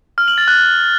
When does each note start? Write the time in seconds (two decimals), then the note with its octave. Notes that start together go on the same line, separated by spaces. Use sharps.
0.18 F6
0.28 F#7
0.38 A6
0.48 F#6